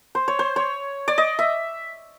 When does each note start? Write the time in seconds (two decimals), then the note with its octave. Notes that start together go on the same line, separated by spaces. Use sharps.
0.15 C5
0.28 C#5
0.39 C5
0.56 C#5
1.08 D5
1.18 D#5
1.39 E5